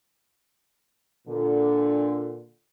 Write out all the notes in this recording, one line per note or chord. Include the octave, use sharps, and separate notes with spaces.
A#2 D3